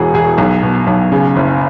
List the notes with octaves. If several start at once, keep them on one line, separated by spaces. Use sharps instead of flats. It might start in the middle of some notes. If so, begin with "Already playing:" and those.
Already playing: E1 E3 F#4 G#4
E1 G#4
B1
B2
B1
C#3
F#1